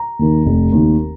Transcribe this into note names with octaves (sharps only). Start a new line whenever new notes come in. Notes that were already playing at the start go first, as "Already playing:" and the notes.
Already playing: A#5
D#2 D#3
F1
D#2 D#3